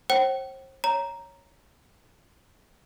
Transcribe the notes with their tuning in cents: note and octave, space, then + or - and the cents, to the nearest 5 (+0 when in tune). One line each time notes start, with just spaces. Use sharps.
C5 +40 G5 -40
C#5 +0 A#5 +0